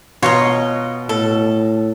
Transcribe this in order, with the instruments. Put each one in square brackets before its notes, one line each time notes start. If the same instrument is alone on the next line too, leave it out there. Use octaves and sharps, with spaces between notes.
[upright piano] B2 [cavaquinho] F4 D#5 [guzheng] C#5 A#5
[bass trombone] A2 [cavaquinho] A4